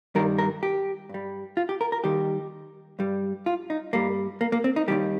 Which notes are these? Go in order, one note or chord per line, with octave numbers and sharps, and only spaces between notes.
G2 D#3 G3 A#4
A#4
G4
G2 G3
F4
G4
A#4
A#4
D#2 D#3 G3 G4
G2 G3
F4
D#4
G2 G3 A#3
A#3
A#3
C4
D#4
D#2 D#3 G3 G4